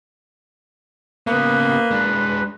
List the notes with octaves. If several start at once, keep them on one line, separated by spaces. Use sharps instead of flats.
C#3 A#3 B3 B4
G#3 D4